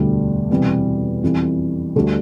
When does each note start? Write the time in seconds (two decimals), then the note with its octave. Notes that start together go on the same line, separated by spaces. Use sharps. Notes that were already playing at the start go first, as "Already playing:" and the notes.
Already playing: E1 D2 D3 G3 D4
0.50 E1 E2 C3 E3 G3
1.23 F2 E3 G3
1.96 D2 D3 G3 D4 G4